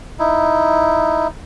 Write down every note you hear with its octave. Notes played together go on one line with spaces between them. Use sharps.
D#4 E4